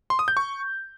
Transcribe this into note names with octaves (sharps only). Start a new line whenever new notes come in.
C6
D#6
G6
C#6